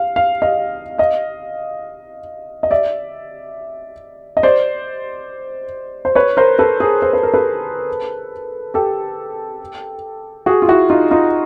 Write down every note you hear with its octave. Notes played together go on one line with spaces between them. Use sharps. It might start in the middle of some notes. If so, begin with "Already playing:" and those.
Already playing: F5
F5
D#5 F5
D#5 F5
D#5
D5 E5
D#5
C5 D5
C5
B4 C#5
A#4 C5
A4 B4
G#4 A#4
C5
B4
A#4
A4 B4
G4 A4
F#4 G#4
F4
E4 F#4
D#4 F4
D#4 F4